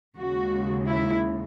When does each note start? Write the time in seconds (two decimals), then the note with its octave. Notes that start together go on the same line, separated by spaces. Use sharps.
0.17 D#2 C#3 G#3 F#4
0.88 E4